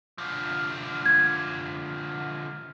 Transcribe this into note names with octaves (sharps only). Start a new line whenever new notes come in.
D3 F3
F6 G#6